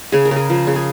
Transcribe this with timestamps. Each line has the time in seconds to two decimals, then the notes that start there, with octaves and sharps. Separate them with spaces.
0.12 C#3 G#4
0.25 A#4
0.31 C#3
0.36 G#4
0.50 F3
0.67 C#3
0.76 G#4